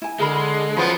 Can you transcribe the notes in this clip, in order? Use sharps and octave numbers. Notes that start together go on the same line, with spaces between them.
E4 G#5
D3 G#3 G#4 A#4 B5
F#2 F3 B3 E4 B5